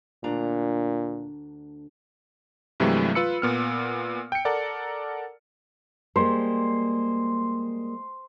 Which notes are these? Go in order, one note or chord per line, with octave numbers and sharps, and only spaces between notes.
D2 A#2 D4 A#5
G2 C3 E3 F#3 G#3 A3
F4 B4 B5 E6 C#7
A#2 B3 F6
G5 C#7
A4 A#4 D5 F#5
G3 G#3 A#3 C5